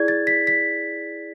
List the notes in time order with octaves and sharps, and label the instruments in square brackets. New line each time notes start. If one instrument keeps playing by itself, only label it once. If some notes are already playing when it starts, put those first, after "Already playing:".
Already playing: [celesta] E4 G#4 D5 G#6
A6
B6
B6